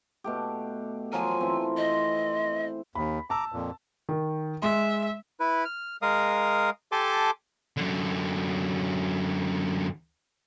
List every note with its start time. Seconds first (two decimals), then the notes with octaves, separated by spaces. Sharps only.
0.24 B2 A3 G4
1.12 F3 F#3 A#4 G#5
1.41 E3 A3 C4
1.77 C5 D#5
2.95 D#2 B5
3.30 A5 A#5 D6 E6
3.52 F2 A#2
4.09 D#3
4.62 G#3 E5 C6
5.40 E4 B4
5.65 F6
6.02 G#3 A#4 F5 D#6
6.92 G4 A4 G#5 A5 C6 D6
7.77 F#2 D3